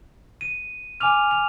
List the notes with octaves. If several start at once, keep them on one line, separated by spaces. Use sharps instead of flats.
D#7
G#5 D6 F6 F7
F7